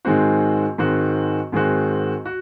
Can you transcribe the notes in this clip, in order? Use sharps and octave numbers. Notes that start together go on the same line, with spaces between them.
G#2 D#3 G#3 C4 F#4
G#2 D#3 G#3 C4 F#4
G#2 D#3 G#3 C4 F#4
F#4